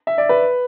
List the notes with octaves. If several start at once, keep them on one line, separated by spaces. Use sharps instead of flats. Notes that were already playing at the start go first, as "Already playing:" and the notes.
E5
D5
B4